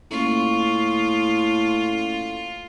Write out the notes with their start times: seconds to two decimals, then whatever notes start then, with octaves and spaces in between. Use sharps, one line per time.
0.11 A2 A#3 C#4 F4 C#6